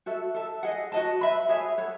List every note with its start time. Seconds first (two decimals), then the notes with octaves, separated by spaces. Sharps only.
0.06 F#4 A4 E5
0.34 A4 E5 A5
0.63 G#4 D#5 F#5
0.92 F#4 A4 D#5 A5
1.21 B4 E5 B5
1.49 G#4 C#5 E5
1.78 A4 C#5 F#5